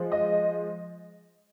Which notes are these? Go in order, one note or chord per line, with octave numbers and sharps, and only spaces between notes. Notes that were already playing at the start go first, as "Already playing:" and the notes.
Already playing: F3 G#3
D#5